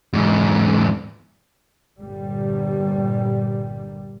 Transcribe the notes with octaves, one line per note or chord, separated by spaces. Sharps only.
E2 G#2
G1 A#2 G3